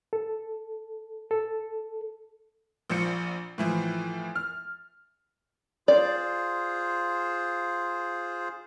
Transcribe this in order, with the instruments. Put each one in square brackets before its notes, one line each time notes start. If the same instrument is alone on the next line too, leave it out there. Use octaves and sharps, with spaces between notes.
[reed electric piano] A4
A4
[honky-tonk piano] A#1 F3 C#7
A2 E3 F3
F6
[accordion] F4 G#4 C5 [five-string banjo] D5